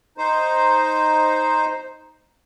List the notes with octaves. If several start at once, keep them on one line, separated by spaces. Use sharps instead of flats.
D#4 C5